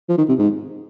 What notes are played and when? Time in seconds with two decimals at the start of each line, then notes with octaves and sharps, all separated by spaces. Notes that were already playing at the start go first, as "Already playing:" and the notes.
0.09 F3
0.18 D#3
0.29 C3
0.39 G#2